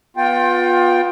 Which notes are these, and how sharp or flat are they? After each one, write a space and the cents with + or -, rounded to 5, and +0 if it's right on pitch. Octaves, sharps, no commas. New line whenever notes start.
B3 -10 F4 +25 G5 +0